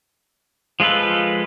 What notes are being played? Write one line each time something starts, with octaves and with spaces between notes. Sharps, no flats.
F3 G#3 F4 A4 B4